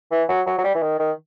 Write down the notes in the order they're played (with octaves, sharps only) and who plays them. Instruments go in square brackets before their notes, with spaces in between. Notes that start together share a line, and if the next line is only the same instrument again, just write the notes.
[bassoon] E3
F#3
F#3
F#3
G3
E3
D#3
D#3